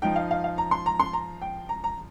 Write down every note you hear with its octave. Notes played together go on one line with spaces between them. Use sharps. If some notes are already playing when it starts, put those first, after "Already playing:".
F3 D#4 G5
F5
F5
F5
A#5
C6
A#5
C6
A#5
G5
A#5
A#5